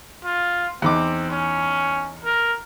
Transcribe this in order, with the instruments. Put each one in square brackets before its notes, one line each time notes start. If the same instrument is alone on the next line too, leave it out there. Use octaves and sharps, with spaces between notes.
[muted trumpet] F4
[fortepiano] E2 D#4 D6 [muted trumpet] C4
[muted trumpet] C#4
A#4